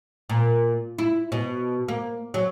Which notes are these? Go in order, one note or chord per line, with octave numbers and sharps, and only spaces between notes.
A#2
E4
B2
A#3
F#3